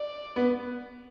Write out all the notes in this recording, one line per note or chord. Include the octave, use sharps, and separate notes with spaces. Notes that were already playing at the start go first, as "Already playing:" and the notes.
Already playing: D5
B3